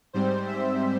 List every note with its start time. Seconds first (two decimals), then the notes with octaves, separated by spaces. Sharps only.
0.13 G#2 G3 C4 C5
0.47 E5